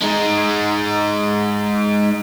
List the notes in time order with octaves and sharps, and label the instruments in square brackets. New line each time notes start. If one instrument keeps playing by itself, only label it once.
[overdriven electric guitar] G#3 D#4